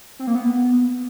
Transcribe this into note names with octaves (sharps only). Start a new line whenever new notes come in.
C4
A#3
B3